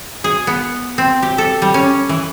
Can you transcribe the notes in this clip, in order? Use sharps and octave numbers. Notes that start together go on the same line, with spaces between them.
G#4
B3
C4
G4
A4
G3
C#4
E3